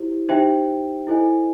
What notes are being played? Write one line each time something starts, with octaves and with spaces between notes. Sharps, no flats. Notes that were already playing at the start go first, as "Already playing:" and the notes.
Already playing: E4 G4 C5
D#4 G4 C5 E5 G5
E4 A4 C5 D#5 G#5